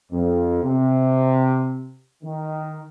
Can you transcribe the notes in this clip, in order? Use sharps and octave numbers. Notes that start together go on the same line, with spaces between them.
F2
C3
D#3